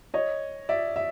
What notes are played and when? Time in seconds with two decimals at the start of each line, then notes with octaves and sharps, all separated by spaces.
0.14 C#5 D#5
0.69 D5 E5
0.96 E5